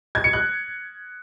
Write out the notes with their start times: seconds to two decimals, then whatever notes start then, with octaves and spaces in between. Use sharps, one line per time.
0.15 G#6
0.24 C#7
0.33 F#6